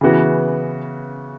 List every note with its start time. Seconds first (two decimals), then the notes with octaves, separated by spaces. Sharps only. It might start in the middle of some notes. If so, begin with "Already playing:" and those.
0.01 C#3 E3 B3 F#4